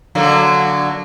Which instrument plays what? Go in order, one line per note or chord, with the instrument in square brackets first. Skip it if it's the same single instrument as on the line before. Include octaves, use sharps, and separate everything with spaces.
[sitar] D3 F#3 A#3